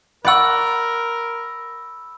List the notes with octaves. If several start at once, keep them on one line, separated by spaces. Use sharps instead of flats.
A#4 D5 F#5 B5 C#6 E6